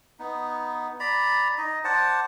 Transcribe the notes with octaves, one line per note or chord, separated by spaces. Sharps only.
B3 D#4
D5 A#5 B5
D#4 D#5
C5 D5 F#5 A5